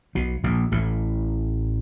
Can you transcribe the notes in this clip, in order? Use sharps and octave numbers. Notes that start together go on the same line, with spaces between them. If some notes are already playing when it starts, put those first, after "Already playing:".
B1 B2
A#1 A#2
A1 A2